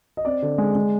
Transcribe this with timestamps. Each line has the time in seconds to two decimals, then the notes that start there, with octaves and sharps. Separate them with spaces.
0.17 D#5
0.25 C4 D5
0.42 D3
0.58 G#3
0.75 G#3